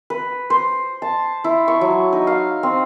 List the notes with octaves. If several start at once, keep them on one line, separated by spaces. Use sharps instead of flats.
B4
C5
A5
E4
C#6
F#3
D#4
F5
C4